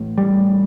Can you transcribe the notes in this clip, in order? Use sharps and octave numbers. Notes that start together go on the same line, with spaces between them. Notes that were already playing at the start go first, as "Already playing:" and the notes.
Already playing: A1 A2
G3